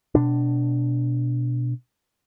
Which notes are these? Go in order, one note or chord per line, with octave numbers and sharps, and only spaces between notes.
B2 D4